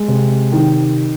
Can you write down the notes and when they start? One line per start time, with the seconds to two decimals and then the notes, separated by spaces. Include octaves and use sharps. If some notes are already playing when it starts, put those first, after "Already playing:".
Already playing: G#3
0.08 C3
0.52 D#3